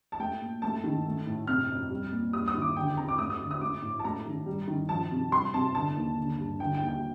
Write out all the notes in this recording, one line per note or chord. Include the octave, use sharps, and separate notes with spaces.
A5
A3 G5
A#2
A3 A5
D#3
A3
A2
C3 F6
F2
G3
A#2
G3 D#6
D#6
D#3
D6
D3 G5
G5
F2 A#5
D6
A3 D#6
D#6
D3
D#6
A3 D6
A2
A5
A3 A#5
D#3
G3
D#3
F3 A5
C3
G3 C6
C3 A5
D3 A5
D#2
D3
G2
D3 G5
G5
D#2
G5